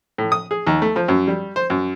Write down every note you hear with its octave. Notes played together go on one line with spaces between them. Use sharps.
A2
D#6
G#4
D#2
A3
F3
F#2
G3
C5
F#2